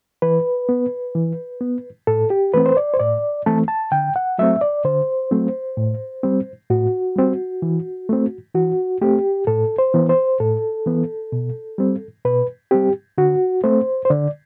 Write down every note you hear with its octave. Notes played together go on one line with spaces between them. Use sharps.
E3 B4
B3
E3
B3
A2 A4
G4
E3 A3 C4 B4
C5
D5
C5
A2 D5
E3 A3 C4 A5
A5
D3 G5
F#5
F#3 A3 C4 E5
D5
D3 C5
F#3 A3 C4
A2
G3 C4
A2 F#4
G3 C4
E3
A3 C4
E3 F#4
A3 C4 G4
A2 A4
C5
E3 B3
C5
A2 A4
E3 B3
B2
G3 C4
B2 B4
G3 C4 G4
D3 F#4
A3 C4 C5
C5
D3 D5